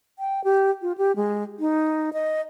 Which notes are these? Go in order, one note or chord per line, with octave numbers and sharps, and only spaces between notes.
G5
G4
F4
G4
G#3
D#4
D#5